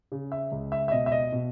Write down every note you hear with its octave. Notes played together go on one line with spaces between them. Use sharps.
C#3
E5
C#2
E5
E5
B2 D#5
E5
D#5
B2